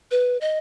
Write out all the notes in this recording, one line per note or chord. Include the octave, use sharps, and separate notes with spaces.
B4
D#5